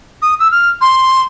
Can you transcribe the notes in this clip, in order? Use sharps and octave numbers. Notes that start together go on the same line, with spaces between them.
D#6
E6
F6
C6